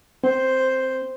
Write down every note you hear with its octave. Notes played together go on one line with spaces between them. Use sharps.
C4 C5